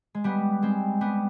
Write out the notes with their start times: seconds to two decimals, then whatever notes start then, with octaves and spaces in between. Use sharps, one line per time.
0.14 G#3
0.24 G3 B3
0.62 G#3 C4
1.01 G3 B3